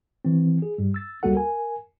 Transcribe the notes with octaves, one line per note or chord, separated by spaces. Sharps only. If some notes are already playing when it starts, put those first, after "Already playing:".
E3 C4
G#4
G2 G3
E6 A6
C#2 G3 A#3 F#4 A4 F#5
A#4 G#5